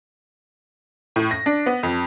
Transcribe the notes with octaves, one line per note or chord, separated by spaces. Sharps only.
A2
A#6
D4
B3
F2